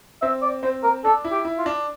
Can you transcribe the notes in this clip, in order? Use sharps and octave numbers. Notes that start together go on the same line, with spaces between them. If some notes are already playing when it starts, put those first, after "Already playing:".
C4 E5
D5
C4 C5
A#4
D4 A4
E4
G4
E4
F4
D4